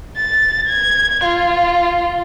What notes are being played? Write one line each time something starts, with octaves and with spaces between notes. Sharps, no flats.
A6
G#6
F4